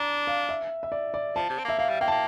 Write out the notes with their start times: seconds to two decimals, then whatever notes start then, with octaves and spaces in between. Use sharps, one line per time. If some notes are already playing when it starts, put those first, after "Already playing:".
Already playing: D4 A#5
0.27 F5
0.49 E5
0.83 E5
0.92 D5
1.14 D5
1.36 F3 A5
1.50 C3
1.59 C4
1.64 A#3 E5
1.79 A#3 F5
1.89 G3
2.01 A#3 G5
2.08 A5
2.11 A#3